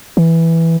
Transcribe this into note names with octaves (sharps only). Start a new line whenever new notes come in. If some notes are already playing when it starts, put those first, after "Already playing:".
E3